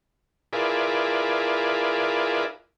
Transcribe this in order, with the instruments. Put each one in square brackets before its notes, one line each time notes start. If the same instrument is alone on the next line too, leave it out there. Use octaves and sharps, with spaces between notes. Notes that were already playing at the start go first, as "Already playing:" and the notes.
[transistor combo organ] E4 F4 G#4 A#4 B4 D5